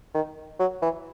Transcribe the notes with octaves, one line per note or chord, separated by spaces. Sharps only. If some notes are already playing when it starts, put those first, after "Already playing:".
D#3
F#3
E3